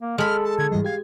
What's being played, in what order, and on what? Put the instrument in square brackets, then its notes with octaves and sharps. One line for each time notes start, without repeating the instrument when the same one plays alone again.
[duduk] A#3
[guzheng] G#3 B5 [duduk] A4 [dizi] F6
[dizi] A5
[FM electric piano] D3 [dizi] G#6
[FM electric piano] G#2 E3 G3 [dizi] D#5
[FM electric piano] G4 G#6 [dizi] F5